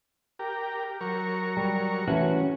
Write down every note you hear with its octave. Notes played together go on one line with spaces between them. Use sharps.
G4 A#4
F#3 A#4 C#6
G3
E3 A3 C#4 F#4